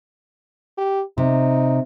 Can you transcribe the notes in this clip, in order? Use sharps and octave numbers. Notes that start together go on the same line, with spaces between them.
G4
C3 D#4